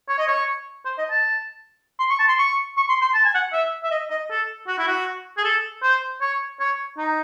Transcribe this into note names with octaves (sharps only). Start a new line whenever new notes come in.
C#5
D#5
C#5
C5
D#5
A5
C6
C#6
A5
C6
C#6
C#6
C6
C6
A5
G#5
F#5
E5
E5
D#5
D#5
A4
F#4
E4
F#4
G#4
A4
C5
C#5
C#5
D#4